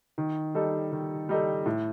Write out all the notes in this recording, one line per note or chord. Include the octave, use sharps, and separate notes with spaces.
D#3
G3 D#4 A4
D#3
G3 D#4 A4
A2